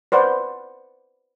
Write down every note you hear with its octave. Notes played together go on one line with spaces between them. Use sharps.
B4 C5 D5 F#5